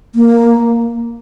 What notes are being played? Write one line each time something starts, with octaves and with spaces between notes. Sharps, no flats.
A#3